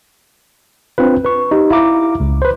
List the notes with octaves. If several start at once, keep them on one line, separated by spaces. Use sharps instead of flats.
C4 D4 F4 B4
B4 C#6
D#4 G4
E4 F5 A#5 D6
C#2
B4 C5